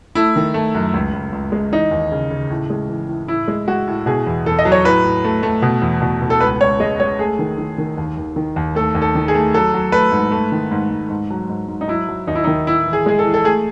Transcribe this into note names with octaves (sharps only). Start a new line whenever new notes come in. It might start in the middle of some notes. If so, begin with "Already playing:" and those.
A3 E4
D#3
A3
F#2
C#2
C#2
C#2
G#3
E3 D#4
D#2
C#3
C#3
A2
G#3
E3
A2
A2 E4
G#3
G#3 F#4
A2
B2 G#4
E2
E2 A4
D#5
F#3
C#5
A2 B4
A2
A3
A3
B2
E2
B2
B2
A4
C#2 B4
C#2 C#5
G#3 D#5
G#3 C#5
A3 G#4
D#3
D#3
D#3
D#2
D#2
D#3
D#2
A3 A4
D#2
A4
D#3
G#4
A3
F#3 A4
F#3
A3 B4
G#2
A3
D#3
G#2
G#2
G#2
F#3
G#2
G#2
D#4
F#3 E4
F#3
D#2 D#4
E4
D#4
D#3
A2 E4
E3
G#4
G#3 G#4
A4
E3
A4
A3 G#4